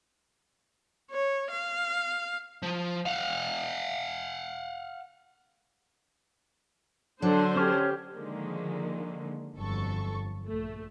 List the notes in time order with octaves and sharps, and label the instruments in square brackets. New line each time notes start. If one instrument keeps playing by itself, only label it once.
[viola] C#5
F5
[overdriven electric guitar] F3
F5 F#5
[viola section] D3 C5 [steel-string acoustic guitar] F#3 [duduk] D4
[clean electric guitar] C#4 C#5 [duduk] G4
[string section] D3 D#3 F3 G#3 A#3
G1 F2 F#3 A4 C#6
A#1 A3